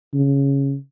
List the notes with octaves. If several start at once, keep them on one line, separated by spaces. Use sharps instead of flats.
C#3